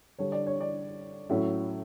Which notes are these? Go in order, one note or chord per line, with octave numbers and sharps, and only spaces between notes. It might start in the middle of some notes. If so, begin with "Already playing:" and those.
D3 G3 D4 C#5
D5
C#5
D5
A2 F#3 C#4 E4